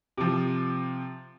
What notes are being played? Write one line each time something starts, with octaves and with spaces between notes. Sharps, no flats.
C3 F3